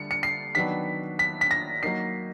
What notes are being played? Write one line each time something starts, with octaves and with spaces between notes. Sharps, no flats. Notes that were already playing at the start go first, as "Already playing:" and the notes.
Already playing: D3 G3 C#7
C#7
C7
D#3 F#3 B3 D4 B6
B6
B6
A#6
F#3 A#3 D#4 C7